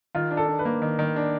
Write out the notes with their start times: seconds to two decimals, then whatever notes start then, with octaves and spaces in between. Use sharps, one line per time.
0.15 D#3 F4
0.31 D4
0.37 A4
0.48 D4
0.59 B4
0.65 A#3
0.82 D#3
0.99 D#3
1.16 D4